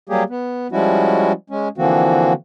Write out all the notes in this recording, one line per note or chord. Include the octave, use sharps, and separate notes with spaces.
F#3 G3 A#3 G4 G#4
B3
F3 G3 G#3 C#4 E4 F#4
G#3 C#4
D3 E3 F3 A#3 C4 F#4